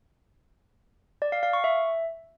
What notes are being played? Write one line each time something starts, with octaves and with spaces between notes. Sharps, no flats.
D5
F5
F5
C#6
E5